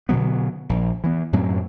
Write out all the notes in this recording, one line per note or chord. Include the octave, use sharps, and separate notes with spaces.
B2 D3 F#3 B3
A#1
E3 B3
F#2 A2 F#3 C4